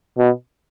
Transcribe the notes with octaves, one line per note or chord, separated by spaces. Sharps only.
B2